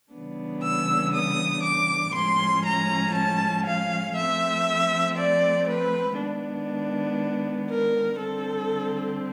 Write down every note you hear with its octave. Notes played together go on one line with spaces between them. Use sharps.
C#3 E3 G3 B3 D4
E6
D#6
D6
A2 F3 G#3 C#4 C6
A#5
A5
F5
F3 A3 C4 E5
D5
B4
D#3 G#3 B3 D4
A#4
D3 G3 C4 A4